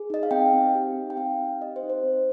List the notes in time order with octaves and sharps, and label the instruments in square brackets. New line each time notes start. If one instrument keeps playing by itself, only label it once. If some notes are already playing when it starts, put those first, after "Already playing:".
Already playing: [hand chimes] G#4
D#4 D#5
F5
C4 G5
C4
G4
D#4
G5
C4 F5
C4
G4 D#5
C5
D#4
C5
C4